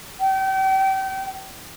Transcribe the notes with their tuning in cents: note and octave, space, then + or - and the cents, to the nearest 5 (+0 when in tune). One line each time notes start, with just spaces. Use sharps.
G5 -35